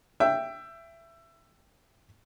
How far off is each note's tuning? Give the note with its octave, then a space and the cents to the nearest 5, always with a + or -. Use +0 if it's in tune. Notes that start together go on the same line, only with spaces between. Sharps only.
E5 +20 G5 +0